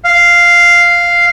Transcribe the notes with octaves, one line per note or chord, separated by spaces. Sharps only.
F5